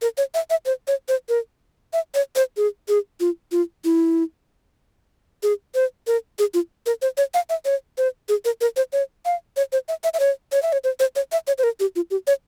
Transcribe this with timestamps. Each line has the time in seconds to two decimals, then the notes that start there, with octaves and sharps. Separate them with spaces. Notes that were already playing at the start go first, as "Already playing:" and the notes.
0.02 A#4
0.18 C#5
0.34 E5
0.50 E5
0.66 C5
0.88 C#5
1.08 C5
1.29 A#4
1.93 E5
2.14 C#5
2.36 C5
2.57 G#4
2.89 G#4
3.20 F4
3.52 F4
3.84 E4
5.43 G#4
5.75 C5
6.07 A#4
6.39 G#4
6.54 F4
6.86 A#4
7.02 C5
7.17 C#5
7.34 F5
7.50 E5
7.65 C#5
7.98 C5
8.29 G#4
8.45 A#4
8.61 A#4
8.76 C5
8.93 C#5
9.25 F5
9.57 C#5
9.72 C5
9.88 E5
10.04 E5
10.14 E5
10.20 C#5
10.52 C#5
10.63 E5
10.73 C#5
10.84 C5
11.00 C5
11.16 C#5
11.32 E5
11.47 C#5
11.58 C5
11.63 A#4
11.80 G4
11.96 F4
12.11 G4
12.27 C#5